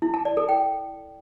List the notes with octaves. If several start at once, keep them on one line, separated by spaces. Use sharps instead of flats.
E4
A5
D5
A4
G5